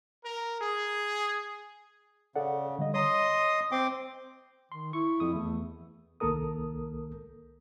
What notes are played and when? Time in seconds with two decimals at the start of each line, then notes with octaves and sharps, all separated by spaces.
0.24 A#4
0.61 G#4
2.36 C#3 A4 D5 F#5
2.79 D3 G3 D#5
2.94 C#5 D#5 A#5 C6 D#6
3.72 C4 G5 C6 D6
4.72 D#3 C6
4.93 E4 C#6
5.20 F2 D#6
5.34 E2 A3
6.20 C2 D#3 A#3 A4 A#4 D#6